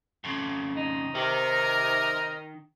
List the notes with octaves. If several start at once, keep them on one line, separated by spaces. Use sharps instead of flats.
F2 C#3
D#4
C3 D#3 A#4